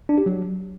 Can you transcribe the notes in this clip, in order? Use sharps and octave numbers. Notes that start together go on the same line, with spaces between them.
D4
G4
F#3